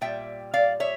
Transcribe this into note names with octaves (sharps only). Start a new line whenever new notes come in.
A#2 G3 E5 G5
D5 F5
C#5 E5